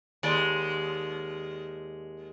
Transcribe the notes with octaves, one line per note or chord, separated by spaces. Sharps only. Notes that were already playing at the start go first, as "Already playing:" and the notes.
D#2 G#3 D5